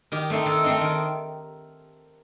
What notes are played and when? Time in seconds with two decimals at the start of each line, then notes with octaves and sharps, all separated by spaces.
0.12 D#3 G4
0.30 A3 C4 D#4
0.46 D#3 A4
0.64 A3 C4 D#4
0.81 D#3